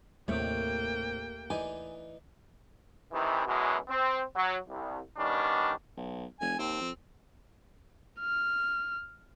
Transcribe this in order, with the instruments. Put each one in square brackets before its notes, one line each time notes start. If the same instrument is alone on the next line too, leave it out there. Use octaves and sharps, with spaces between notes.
[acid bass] D#2 [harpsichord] A2 C3 [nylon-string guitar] A3 [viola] A#3 G5
[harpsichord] E3 D#4 D5 [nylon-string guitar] G#5
[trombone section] C3 D#3 E3
F#2 B2 E3 F#3 G#3
C4
F#3
C2
D#3 G3 B3 C#4 D4
[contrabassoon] B1
[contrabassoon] F1 [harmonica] G#5
[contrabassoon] D#2 [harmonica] C4
[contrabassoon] F2
[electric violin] F6